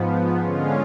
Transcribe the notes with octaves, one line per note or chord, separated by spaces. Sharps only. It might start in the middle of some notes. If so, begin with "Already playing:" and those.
Already playing: G#2 F3 B3
D3 G#3 C#4 F4